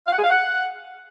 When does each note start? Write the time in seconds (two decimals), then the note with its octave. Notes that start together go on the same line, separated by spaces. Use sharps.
0.07 F5
0.13 F#5
0.18 G#4
0.24 F5
0.30 F#5